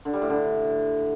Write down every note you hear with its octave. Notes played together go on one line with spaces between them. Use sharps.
D3
G3
A2
D3